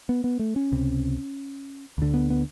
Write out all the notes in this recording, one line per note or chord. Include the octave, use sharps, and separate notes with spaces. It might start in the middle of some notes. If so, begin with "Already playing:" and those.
B3
B3
A3
C#4
C#2 C3
D2 D3
B3
B3